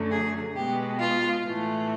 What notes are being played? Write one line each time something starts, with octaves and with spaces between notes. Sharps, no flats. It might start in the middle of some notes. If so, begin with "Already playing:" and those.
Already playing: F#2 D3 F#3 A3
G#4
B2 G#3 B3 G4
F4
A2 E3 A3